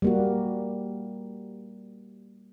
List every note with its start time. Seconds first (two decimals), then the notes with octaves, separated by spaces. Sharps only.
0.02 G3 A#3 F#4